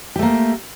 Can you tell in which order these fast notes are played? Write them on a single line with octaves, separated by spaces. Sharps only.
G4 A3 A#3